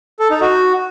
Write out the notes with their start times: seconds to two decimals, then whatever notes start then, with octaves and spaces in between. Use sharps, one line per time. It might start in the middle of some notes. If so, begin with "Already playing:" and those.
0.20 A4
0.30 D#4
0.41 F#4